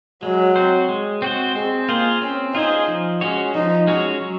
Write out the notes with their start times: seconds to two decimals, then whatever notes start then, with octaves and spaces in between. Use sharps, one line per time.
0.23 F#3 G#3
0.56 C4 F#4 C5
0.89 G#3
1.22 C4 F#4 C5
1.55 G#3 C4
1.88 A#3 F4 G#4 C5
2.22 C4 C#4
2.54 D#4 F4 G#4 C5
2.88 F3
3.21 G#3 C#4 F#4 C#5
3.54 F3 D#4
3.87 G#3 C#4 F#4 C#5
4.21 F#3